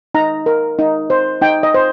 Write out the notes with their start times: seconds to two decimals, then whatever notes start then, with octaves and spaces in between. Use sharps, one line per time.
0.14 D#4 A#5
0.46 A#4
0.79 D#4
1.10 C5
1.41 D#4 G5
1.63 D#5
1.74 C5